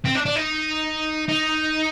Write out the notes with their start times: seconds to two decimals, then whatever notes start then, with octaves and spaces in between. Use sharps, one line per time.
0.05 C4
0.15 D4
0.26 D4
0.36 D#4
1.28 D#4